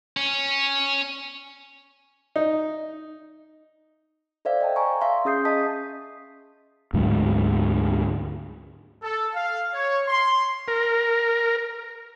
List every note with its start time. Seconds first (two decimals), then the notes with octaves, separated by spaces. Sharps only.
0.17 C#4
2.36 D#4
4.45 A4 C5 D5 E5 F5
4.61 D#5 G5 A5
4.76 G#5 A#5 C#6
5.01 E5 F5 C6
5.25 C#4 G#4 D#6 G6 C7
5.45 D#5 A5 D#6 B6
6.94 D2 G#2 F#3
9.02 A4
9.34 F5
9.74 C#5
10.07 C6
10.68 A#4